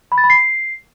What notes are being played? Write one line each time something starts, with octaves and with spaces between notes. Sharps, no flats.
B5
A6
B5
C7